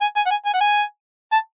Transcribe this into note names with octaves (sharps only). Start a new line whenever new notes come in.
G#5
G#5
F#5
G#5
G#5
F#5
G#5
A5